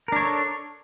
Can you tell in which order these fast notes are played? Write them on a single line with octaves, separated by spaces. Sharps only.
A#4 D4 C#5 A4